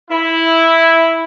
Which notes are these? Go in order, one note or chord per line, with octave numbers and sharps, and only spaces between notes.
E4